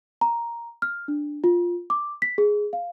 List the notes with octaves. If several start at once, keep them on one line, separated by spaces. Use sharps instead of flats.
A#5
F6
D4
F4
D6
B6
G#4
F5